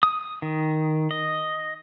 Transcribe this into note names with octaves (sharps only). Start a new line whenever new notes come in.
D#6
D#3
D#5